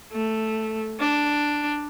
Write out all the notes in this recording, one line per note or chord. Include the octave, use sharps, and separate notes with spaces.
A3
D4